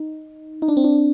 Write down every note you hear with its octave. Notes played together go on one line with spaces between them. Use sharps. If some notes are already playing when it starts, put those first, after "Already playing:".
Already playing: D#4
D#4
D4
C4
D4